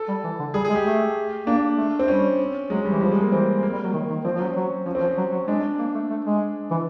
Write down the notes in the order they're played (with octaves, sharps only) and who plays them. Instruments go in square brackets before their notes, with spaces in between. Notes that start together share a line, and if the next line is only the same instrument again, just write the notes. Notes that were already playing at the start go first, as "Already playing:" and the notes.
Already playing: [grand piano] A4
[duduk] G3
E3
D3
[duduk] G3 [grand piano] G#4
[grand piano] G#4
[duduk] G#3
[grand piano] G4
[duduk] A3
[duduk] A#3 [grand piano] D4
[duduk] A3
[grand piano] C4
[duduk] G3 [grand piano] C#4
[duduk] F#3 [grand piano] G#3
[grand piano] G3
[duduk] E3
[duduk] F3 [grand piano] G3
[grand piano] G#3
A#3
[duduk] E3 [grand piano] C4
[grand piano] A#3
[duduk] G3
F#3
D#3
D#3
[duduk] F3 [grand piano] C4
[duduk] F3
[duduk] F#3 [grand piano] C#4
[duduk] F#3
[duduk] F3 [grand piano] C#4
[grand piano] C4
[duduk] F3
[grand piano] C#4
[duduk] F#3
F#3
[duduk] G#3 [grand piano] D4
[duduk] A#3
A3
A3
G#3
E3